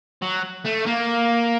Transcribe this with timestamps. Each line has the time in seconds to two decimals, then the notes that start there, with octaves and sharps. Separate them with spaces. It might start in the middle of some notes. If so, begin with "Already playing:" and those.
0.22 F#3
0.65 A3
0.86 A#3